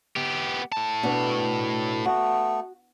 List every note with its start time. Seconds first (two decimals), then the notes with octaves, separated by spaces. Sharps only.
0.16 B3 G4
0.72 A2 A5
1.03 B2 B3 D4
2.06 A3 B3 F#4